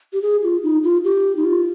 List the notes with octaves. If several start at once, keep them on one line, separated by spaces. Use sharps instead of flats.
G4
G#4
F4
D#4
F4
G4
D#4
F4